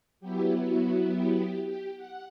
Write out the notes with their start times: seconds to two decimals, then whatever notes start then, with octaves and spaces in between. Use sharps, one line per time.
0.20 F#3 B3 E4 G4
0.63 F#4
1.08 G4
1.36 G4
1.65 G4
1.95 F#5